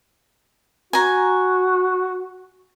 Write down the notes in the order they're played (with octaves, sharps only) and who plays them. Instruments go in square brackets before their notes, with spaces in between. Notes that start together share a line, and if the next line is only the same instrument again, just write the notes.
[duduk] F#4 [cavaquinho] G#5 A#5